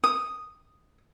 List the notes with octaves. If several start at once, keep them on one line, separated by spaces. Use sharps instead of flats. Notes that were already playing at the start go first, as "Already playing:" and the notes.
D#6